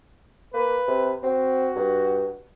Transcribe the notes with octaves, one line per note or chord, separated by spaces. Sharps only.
A#3 B4
C3
C4 F#4
G2